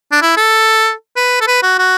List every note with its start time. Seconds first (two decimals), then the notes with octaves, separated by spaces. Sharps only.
0.12 D4
0.22 E4
0.37 A4
1.16 B4
1.41 A4
1.48 B4
1.63 F#4
1.79 F#4